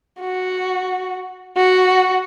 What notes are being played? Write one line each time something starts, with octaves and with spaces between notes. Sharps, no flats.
F#4
F#4